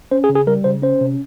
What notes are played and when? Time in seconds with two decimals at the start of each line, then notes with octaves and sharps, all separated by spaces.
0.11 C#4 C5
0.24 G#4
0.29 C#3
0.35 G#4
0.47 G3 A#4
0.64 C#3 C5
0.82 C#4 C5
1.01 C3